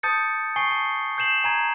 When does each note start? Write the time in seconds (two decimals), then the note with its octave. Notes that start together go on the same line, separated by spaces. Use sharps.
0.03 A5 D#6 G6 A6 C#7
0.56 G#5 C#6 C7 G7
0.71 A5
1.18 G6 C7 E7 F#7
1.44 G#5 A#5 G#6